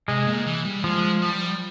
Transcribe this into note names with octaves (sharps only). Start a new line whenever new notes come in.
C3 G#3
A#2
E3
G3
F3 G#3
G3